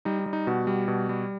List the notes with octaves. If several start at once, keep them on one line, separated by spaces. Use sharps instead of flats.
G3 D#4
D#4
G3
D#4
B2 F#4
G3
B2
G3